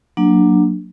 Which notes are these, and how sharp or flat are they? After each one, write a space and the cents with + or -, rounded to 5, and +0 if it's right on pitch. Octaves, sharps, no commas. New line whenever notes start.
F#3 -10 A#3 +0 D4 +10